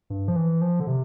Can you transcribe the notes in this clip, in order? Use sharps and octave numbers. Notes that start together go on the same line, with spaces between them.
G2
F3
E3
F3
D3
C3